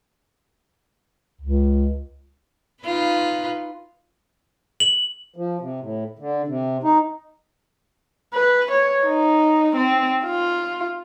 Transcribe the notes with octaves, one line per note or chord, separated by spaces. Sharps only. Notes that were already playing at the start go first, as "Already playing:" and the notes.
C#2
D#4 F4 B4
F#7
F3
C3
A2
D3
C3
D#4
B4
C#5
D#4
C4
F4